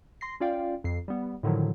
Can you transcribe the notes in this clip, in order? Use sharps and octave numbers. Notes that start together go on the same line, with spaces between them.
C6 A#6 C7
C#4 F4 D5 F5 G5
F2 C7
G3 B3
A2 D3 D#3 F3 F#3